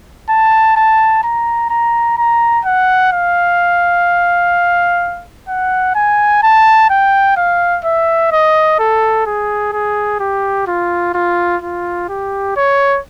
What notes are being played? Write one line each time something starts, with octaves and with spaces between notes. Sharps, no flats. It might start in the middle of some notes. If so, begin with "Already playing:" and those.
A5
A5
A#5
A#5
A#5
F#5
F5
F#5
G#5
A5
G5
F5
E5
D#5
A4
G#4
G#4
G4
F4
F4
F4
G4
C#5